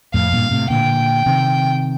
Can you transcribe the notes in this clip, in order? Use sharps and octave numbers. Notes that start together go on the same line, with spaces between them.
F2 A2 F5
G2 A#2
A2 C3
A#2 D3 G5
C3 D#3